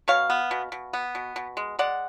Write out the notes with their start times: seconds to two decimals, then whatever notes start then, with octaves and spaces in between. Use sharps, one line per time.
0.08 B2 C#5 F5
0.30 B3
0.51 B2
0.72 B2
0.93 B3
1.15 B2
1.36 B2
1.57 G#3
1.79 G#3 D5 F#5